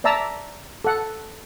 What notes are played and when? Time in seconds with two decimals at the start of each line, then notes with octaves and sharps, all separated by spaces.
0.04 D5 E5 A5 A#5 E6
0.84 A4 F#5